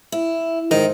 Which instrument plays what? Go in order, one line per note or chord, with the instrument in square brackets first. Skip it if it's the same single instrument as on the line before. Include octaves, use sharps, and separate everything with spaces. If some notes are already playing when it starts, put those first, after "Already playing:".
[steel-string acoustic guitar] E4
[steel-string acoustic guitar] G#2 [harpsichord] D#3